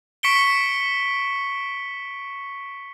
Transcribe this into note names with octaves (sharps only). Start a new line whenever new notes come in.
C#6 B6 C#7 D7 G7